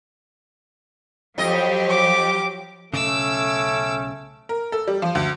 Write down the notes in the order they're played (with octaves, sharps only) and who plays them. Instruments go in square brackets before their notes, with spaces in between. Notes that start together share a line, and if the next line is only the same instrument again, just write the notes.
[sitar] F2 D#5 [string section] F3 F#3 G4
[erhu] D6
[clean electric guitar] B1 G2 C#3 [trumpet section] A3 C#4 [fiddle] D6 E6
[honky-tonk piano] A#4
A4
G3
F3
D2